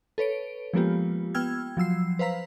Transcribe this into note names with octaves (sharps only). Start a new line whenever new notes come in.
A4 B4 C#5 D7
F3 G#3 A#3 B3 F4 G4
B3 G5 E6 F6 G#6
F3 F#3 E6 C7
B4 C5 F5 A#5 B6